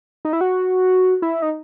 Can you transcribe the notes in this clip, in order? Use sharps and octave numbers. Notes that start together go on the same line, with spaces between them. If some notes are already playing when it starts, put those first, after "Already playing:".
D#4
E4
F#4
E4
D#4